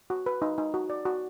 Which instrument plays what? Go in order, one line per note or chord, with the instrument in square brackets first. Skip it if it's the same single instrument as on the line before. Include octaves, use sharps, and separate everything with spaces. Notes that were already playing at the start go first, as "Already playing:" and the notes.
[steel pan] F#4
B4
D#4
D#4
F#4
D5
F#4